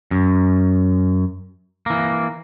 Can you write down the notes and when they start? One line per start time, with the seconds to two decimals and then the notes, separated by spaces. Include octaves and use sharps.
0.11 F#2
1.86 E3 A#3